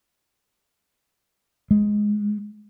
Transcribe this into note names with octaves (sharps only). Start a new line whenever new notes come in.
G#3